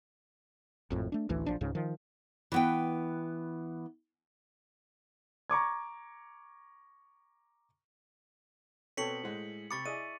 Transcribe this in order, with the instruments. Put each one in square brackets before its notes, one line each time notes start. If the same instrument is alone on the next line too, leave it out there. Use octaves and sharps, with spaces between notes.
[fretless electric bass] G#1 F2 A2
A3 D4
A1 D2 E3
A#1 F3 D4
C#2 G#2 C#3
D#3 F3
[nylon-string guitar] E3 B3 G5
[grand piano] A#5 C#6 D6 G#6
[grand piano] B2 B3 C4 [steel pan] A4 C#5 [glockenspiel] B6 C#7 F#7
[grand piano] A2 G#3 [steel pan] C5 F#5
[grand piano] C3 B5 D6 [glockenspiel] C#6 A6 C#7
[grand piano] E4 [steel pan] G#4 D5 D#5 [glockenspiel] D#7